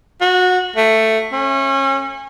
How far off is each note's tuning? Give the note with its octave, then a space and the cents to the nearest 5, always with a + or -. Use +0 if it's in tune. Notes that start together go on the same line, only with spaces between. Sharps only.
F#4 -20
A3 +10
C#4 -30